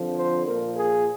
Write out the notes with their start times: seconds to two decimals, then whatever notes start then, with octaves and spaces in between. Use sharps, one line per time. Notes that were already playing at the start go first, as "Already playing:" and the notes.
Already playing: F2 D3 F3
0.15 C5
0.46 A#2 F3 A#4
0.77 G#4